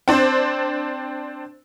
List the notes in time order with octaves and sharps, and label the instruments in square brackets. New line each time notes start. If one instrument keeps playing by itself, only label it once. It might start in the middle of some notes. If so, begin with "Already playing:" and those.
[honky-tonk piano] C4 D4 C5